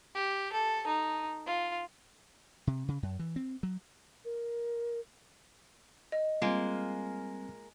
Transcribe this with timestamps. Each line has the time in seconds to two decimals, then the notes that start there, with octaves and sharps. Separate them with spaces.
0.15 G4
0.53 A4
0.87 D#4
1.47 F4
2.67 C3
2.88 C#3
3.03 F#2
3.19 E3
3.36 C4
3.63 F#3
4.25 A#4
6.12 D#5
6.42 G3 G#3 A#3 C4 F4